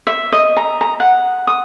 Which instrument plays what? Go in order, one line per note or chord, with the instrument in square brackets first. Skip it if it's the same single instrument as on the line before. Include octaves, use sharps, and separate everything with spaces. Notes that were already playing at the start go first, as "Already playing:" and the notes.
[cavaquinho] E5
D#5
A#5
A#5
F#5
D#6